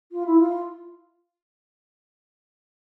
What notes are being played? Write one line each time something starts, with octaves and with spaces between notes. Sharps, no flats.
F4
E4
F4